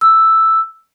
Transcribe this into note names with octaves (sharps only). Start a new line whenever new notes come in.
E6